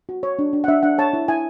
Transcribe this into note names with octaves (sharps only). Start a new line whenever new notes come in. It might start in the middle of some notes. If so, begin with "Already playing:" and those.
F#4
C#5
D4
D4
F#5
D4 E5
D4 F#5
C#5 A5
E4
E4 G#5